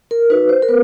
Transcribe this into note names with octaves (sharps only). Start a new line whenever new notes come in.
A#4
D#4 F#4 B4
C5
A#4
B3 B4